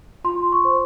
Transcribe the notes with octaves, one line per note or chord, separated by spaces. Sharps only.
F4 C6
C#6
C5